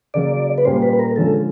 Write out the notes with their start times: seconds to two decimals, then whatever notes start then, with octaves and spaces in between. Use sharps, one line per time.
0.14 C#3 F#3 A#3 D5
0.58 B4
0.65 A#2 G3 A#3 C#4 C5
0.82 B4
0.93 B4
0.99 A#4
1.16 D3 F3 G#3 C#4 A4